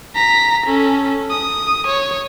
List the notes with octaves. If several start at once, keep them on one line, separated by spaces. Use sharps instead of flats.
A#5 B6
C#4 A4
D#6
C#5